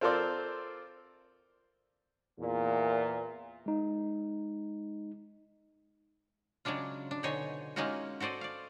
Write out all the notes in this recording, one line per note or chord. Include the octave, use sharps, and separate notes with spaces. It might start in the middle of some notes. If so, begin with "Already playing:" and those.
C4 F4 A4 A#4 C5 D5
E2 A#2
G#3 D#4
C#3 F#3 G#3 D4 F4
D4
B2 D3 D#4 C5 C#5 G#5
G#3 A#3 C#4 D#4 F4 F#4
F#4 A4 C5 D5 D#5
D5 F5